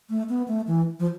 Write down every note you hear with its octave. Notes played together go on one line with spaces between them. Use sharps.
A3
B3
A3
E3
F3